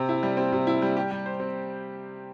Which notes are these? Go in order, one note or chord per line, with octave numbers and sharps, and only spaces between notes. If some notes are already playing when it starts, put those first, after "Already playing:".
Already playing: C3 C4
E4
G3
C4
C3
E4
G3
G4
G3
C5
C4